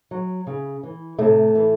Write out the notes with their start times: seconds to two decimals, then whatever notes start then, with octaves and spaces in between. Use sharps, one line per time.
0.11 F#3
0.47 C#3
0.83 E3
1.18 A2 C3 A3
1.55 E3